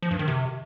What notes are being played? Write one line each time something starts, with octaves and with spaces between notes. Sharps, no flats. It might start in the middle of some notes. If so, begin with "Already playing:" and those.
F3
G2
D#3
C3